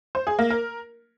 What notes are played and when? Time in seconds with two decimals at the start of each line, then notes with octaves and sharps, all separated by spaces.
0.15 C5
0.27 G#4
0.39 A#3
0.50 A#4